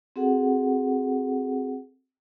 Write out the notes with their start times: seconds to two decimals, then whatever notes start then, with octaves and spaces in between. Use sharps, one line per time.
0.16 C4 F#4 G#4 A4 F#5